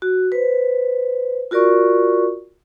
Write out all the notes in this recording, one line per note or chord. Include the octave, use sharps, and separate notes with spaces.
F#4
B4 C5
F4 F#4 A#4 D5 C#6